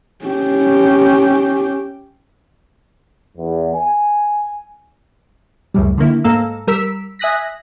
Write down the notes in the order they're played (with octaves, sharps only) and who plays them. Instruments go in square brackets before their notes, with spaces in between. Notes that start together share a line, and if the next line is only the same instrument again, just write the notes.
[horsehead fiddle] C#4 G4
[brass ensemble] E2
G#5
[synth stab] C#2 F#2 A2 G3
D3 D#3 A#3 E4
G#2 A#3 A4 F5 A#5 E6
G3 A#4 E6 B6
E5 G#5 D#6 F#6 A#6 B6